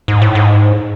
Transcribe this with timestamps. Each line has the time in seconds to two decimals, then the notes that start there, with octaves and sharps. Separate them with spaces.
0.08 G#2
0.22 A2
0.35 G#2